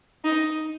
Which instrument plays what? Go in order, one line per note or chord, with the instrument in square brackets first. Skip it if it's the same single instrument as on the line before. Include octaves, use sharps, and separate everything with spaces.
[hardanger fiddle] D#4